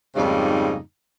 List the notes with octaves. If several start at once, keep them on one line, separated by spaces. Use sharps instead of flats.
F2 G#2 C#3 G3 A#3 D#4